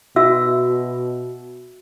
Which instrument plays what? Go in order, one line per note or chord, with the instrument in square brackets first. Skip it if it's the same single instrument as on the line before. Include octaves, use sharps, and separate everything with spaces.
[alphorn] B2 [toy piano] F#4 E5 E6